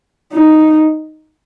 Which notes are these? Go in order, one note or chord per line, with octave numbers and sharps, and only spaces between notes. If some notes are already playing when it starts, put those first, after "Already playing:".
D#4